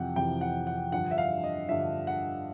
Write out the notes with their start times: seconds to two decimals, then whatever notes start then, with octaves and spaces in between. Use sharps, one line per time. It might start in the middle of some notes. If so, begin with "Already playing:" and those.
Already playing: F2 C3 E3 F#5 G5
0.16 F2 C3 E3 G5
0.41 F#5
0.67 F#5
0.92 G2 D3 F3 F#5
1.11 E5
1.18 F5
1.44 D#5
1.69 G2 D3 F3 E5
2.07 F#5